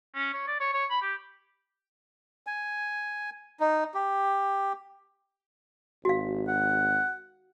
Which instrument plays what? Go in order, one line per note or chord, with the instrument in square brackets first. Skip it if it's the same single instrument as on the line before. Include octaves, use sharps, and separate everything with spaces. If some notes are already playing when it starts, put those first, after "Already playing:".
[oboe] C#4
C#5
D5
C#5
C#5
B5
G4
[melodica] G#5
D#4
G4
[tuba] G#1 [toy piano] F#4 F5
[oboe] F#5